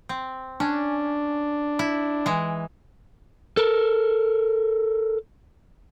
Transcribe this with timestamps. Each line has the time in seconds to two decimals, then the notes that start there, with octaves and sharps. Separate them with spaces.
0.09 C4
0.60 C#4 D4
1.79 E4
2.26 E3 G#3
3.57 A4 A#4